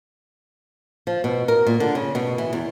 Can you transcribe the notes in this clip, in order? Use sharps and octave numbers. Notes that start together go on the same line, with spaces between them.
F3
B2
A#4
A#2
D3
C#3
B2
E3
E2